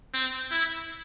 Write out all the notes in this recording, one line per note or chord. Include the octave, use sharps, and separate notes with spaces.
C4
E4